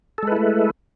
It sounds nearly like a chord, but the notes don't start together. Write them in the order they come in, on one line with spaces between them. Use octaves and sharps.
A4 G#3 B4 E4 A3